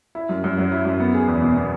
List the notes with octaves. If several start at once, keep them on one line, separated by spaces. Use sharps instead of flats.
E4
F#2
F#2
F#3
E4
F#2
B3
G#4
E2
B2
B3